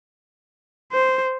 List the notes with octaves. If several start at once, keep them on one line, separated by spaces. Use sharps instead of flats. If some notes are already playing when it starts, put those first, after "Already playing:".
C5